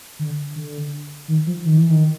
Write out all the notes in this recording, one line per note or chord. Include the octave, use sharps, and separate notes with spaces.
D3
D3
D#3
F3
D#3
E3
D#3